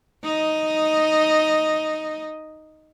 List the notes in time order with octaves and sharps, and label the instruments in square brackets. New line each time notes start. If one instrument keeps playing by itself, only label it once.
[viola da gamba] D#4 D#5